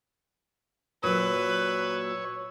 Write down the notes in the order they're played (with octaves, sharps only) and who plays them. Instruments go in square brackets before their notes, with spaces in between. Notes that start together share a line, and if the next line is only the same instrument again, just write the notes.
[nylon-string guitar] A#2 F#3 [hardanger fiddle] B4 [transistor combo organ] C#5 [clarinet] E6